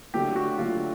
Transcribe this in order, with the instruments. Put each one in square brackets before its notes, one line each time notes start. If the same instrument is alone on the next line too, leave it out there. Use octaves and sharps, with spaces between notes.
[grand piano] D3 F#3 A3 G4
F#4
D3 F#3 A3 F4